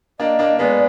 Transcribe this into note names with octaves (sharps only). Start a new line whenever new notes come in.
A#3 D4 D#5
A#3 D4
G#3 B3 D5 D#5